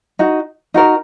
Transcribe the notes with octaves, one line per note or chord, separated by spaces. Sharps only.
D#4 F#4
D#4 F#4 A#4